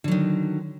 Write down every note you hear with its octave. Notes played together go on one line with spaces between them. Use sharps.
D3 D#3 F#3